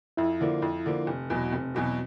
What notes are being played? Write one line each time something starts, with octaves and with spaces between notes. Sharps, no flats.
F2 E4
D3 F3 A#3
F2
D3 F3 A#3
F1
E2 B2 F#3
F1 C4
E2 B2 F#3